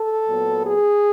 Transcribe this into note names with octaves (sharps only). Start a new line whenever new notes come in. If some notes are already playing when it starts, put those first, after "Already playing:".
Already playing: A4
A#2 F#3 B3
G#4